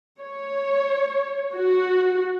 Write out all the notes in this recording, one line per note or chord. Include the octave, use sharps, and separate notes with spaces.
C#5
F#4